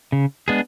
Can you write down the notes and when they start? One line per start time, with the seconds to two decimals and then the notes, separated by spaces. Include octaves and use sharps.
0.12 C#3
0.48 G#3 B3 D4 G#4